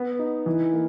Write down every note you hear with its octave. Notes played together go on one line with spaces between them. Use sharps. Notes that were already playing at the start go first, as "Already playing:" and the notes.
Already playing: B3
D#4
E3
A#3